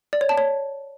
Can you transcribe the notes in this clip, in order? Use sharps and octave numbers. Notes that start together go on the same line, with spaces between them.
D5
C#5
A5
C#5